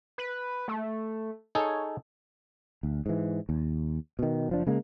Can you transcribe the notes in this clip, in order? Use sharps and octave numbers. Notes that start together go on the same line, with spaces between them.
B4
A3
D#4 G#4 A4 C#5
D2
G#2 E3
D#2
B2 D#3
F#1 F3 D4
C#3 G#3 A#3